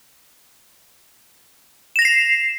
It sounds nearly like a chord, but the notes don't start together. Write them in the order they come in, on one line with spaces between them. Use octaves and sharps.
E7 A#6 F7 C7